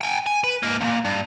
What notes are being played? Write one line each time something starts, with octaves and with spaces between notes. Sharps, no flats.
G5 G#5
G#5
B4
G#2 A#3
C#2 A#2
G2